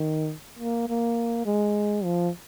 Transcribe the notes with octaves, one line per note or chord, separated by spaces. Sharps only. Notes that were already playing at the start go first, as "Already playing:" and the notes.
Already playing: D#3
A#3
A#3
G#3
F3